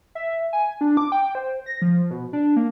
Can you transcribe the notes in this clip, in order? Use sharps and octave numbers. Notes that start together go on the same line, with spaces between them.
E5
G#5
D4
D6
G5
C5
A#6
F3
B2
D4
A#3